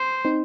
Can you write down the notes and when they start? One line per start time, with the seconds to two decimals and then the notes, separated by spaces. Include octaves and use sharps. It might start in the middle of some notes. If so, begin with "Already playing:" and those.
Already playing: C5
0.25 C4 D#4